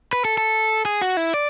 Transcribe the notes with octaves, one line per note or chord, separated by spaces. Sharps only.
B4
A4
A4
G#4
F#4
E4
D5